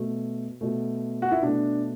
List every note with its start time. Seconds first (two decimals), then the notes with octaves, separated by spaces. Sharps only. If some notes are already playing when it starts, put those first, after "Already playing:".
Already playing: B2 A3
0.61 B2 A3
1.22 F#4
1.32 E4
1.42 B2 A3 D4